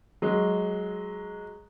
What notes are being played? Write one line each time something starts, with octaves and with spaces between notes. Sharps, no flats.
F#3 G#3